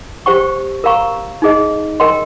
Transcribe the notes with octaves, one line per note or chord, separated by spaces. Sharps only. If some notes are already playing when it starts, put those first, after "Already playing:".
G4 C5 G5 C#6
A#4 F5 A#5 C#6
D#4 G#4 D#5
A#4 D#5 G5 C6